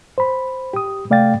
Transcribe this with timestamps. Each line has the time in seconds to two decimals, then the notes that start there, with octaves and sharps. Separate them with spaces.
0.18 C5 B5
0.73 G4 D#6
1.10 C3 A3 D5 F5 G5 A6